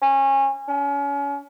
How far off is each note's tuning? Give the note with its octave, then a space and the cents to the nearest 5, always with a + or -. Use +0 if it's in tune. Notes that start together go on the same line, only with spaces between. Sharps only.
C#4 -25
C#4 +35